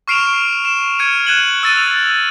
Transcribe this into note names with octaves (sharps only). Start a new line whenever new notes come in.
C#6 F6 C7 D7 E7 F7
E7
F6 G#6 C#7 D#7
F#6 G#6 D#7 E7 F#7
E6 A6 D#7
F7